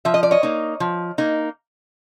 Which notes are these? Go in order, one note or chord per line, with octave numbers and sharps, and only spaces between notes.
F3 E5
D#5
D5
C#5 D#5
A#3 D#4
F3
A#3 D#4